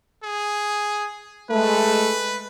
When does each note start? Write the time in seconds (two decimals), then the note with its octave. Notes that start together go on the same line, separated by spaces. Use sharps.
0.24 G#4
1.51 G#3 A3 B4